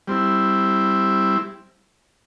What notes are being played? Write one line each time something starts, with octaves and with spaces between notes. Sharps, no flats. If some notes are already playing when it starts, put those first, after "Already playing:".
G3 C4 E4